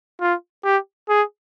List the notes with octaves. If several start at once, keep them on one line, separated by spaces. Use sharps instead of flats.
F4
G4
G#4